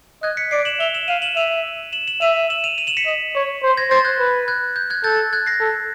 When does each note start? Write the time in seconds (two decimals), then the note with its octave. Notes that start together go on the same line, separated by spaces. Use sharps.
0.23 D#5 F#6 G#6
0.37 B6 C#7
0.51 D5 C7 D7
0.65 E7 F#7
0.80 E5 F7 G7
0.95 E7 F#7
1.08 F5 D#7 F7
1.22 E7 F#7
1.36 E5 D#7 F7
1.93 E7 F#7
2.08 E7 F#7
2.21 E5 D#7 F7
2.50 E7 F#7
2.64 D#7 F7
2.78 D#7 F7
2.87 E7 F#7
2.97 B6 C#7
3.06 D#5
3.35 C#5
3.63 C5
3.77 G#6 A#6
3.91 C5 G6 A6
4.05 F#6 G#6
4.20 B4
4.48 F#6 G#6
4.76 G6
4.90 F#6 G#6
5.04 A4 G6 A6
5.33 F#6 G#6
5.46 A#6 C7
5.60 A4